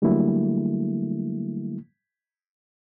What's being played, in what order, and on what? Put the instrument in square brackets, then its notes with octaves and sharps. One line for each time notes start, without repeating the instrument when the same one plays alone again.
[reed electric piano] D3 F#3 G3 A3 A#3 E4